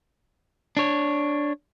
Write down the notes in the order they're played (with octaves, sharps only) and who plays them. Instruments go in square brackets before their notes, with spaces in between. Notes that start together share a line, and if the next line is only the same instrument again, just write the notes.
[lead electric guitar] D4 C#5